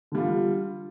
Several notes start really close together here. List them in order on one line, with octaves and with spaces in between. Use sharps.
D3 G3 F4